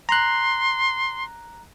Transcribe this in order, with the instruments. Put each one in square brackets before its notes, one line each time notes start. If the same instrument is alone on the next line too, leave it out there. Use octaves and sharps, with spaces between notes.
[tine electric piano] A#5 F#6 [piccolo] C6